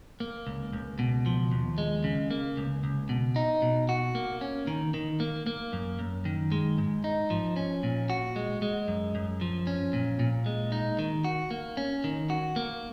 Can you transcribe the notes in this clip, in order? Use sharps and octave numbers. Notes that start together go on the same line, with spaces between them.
A#3
C#2
C#2
B2
F3
D#2
G#3
C#3
A#3
C#2
C#2
B2
D#4
B2
F#4
A#3
C#4
D#3
D#3
A#3
A#3
F#2
F#2
D#3
G#3
G#2
D#4
F3
C#4
A#2
F#4
G#3
G#3
F#2
F#2
F3
C#4
A#2
A#2
G#3
D#4
D#3
F#4
A#3
C#4
D#3
F#4
A#3